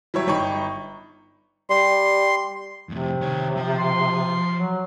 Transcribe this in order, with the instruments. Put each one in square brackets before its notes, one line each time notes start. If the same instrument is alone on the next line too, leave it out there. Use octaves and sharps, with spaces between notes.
[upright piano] F#3 G3 E4 G4 C#5
G1 D#4 D5 G5 B5 C#6
[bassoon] G3 [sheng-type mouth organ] C6
[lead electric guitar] F2 A2 [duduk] C3
[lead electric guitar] D#3 C#5
F3
[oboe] C6
[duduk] F#3